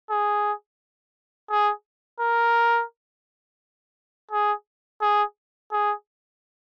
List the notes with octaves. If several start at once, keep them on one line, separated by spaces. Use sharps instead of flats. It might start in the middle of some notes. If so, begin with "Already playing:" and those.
G#4
G#4
A#4
G#4
G#4
G#4